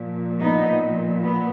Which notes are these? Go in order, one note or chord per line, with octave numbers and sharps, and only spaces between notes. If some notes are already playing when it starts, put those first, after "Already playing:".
Already playing: A#2 F3
B3 D#4
B3